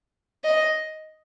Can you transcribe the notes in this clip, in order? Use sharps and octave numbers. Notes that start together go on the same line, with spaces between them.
D#5